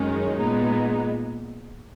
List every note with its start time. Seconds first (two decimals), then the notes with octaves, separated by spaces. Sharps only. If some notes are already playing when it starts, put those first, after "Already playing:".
Already playing: F#2 D#3 G#3 C#4
0.40 A#2 G#3 B3 D#4